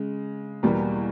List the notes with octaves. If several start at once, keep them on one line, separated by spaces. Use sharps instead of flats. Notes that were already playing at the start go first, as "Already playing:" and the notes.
Already playing: C#3 G#3
E2 B2 G3 A#3